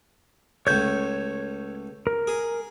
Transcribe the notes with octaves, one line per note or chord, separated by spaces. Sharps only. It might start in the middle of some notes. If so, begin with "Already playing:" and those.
C#2 A3 C#5 G6
A#4
G#4